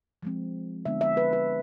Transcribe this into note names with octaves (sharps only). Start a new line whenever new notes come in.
F3 G#3 C4
D3 G#3 B3 D4 E5
E5
B4
B4